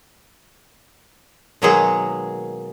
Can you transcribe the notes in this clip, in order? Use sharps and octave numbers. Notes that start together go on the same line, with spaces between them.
B2 D#3 F#3 G#3 A#3 G#4